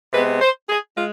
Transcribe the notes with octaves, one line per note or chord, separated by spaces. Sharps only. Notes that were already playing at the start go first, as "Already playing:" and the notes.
C3 G#3 B3 B4
C5
G#4
G#3 F4